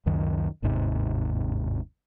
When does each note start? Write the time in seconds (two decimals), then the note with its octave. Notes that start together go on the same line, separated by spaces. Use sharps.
0.06 C#2 F#2 D#3
0.62 G1 D#2 G#2 C3